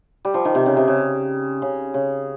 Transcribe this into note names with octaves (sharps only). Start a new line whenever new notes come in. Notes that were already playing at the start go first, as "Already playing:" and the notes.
G3
F3
D#3
C3
C#3
C3
C#3
C#3
C#3